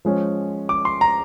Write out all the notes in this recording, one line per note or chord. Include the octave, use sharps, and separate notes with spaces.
F3 G#3 C#4
D6
C6
A#5